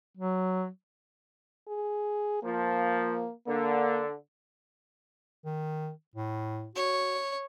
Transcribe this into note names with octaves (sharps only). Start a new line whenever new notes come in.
F#3
G#4
F3 A#3
D3 A#3
D#3
A2
F#4 C#5